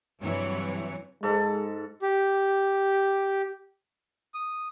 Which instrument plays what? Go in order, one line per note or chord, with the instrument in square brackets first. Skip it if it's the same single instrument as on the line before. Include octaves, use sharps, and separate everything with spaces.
[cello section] G2 C3 E3 F#3 C#5
[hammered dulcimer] G#2 A4 [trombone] G#3
[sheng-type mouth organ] G4
D#6